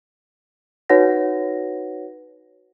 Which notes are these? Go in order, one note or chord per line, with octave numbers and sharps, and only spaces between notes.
D#4 F#4 B4 C#5 F#5 A#6